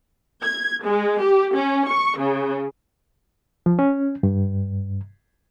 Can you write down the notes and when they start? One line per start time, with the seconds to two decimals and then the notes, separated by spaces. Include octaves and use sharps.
0.42 G#6
0.84 G#3
1.22 G4
1.55 C#4
1.89 C#6
2.20 C#3
3.66 F3
3.79 C#4
4.23 G2